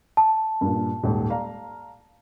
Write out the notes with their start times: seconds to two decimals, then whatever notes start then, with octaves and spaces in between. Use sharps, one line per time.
0.17 A5
0.61 G2 A#2
1.03 D#1 G#2
1.30 D5 F5 A#5